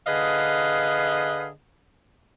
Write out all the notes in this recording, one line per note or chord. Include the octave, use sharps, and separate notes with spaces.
D3 G#4 B4 D#5 F5